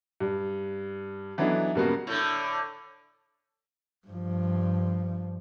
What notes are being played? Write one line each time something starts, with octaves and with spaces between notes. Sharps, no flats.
G2
E3 F#3 B3 D4 D#4 A4
G2 C#3 A#3 B3 F#4
A2 D3
G2 F3